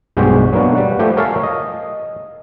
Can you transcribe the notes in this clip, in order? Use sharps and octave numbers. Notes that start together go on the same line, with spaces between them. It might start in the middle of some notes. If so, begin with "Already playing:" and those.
B1 G2 G#3 F#4 G4 C5
F#3 A#3 B3 D4 F#4
G3 F#5
F3 A3 G4
A#4 C#5 E5 F5 G#5 A5
D#5